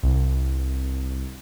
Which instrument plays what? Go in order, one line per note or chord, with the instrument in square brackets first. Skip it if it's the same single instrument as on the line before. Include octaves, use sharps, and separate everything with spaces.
[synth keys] C2